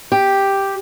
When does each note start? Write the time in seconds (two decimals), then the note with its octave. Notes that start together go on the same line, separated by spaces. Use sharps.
0.12 G4